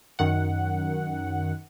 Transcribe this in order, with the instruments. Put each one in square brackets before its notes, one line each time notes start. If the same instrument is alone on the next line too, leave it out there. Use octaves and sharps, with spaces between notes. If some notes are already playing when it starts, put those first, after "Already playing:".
[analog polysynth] F#2 D#3 F#5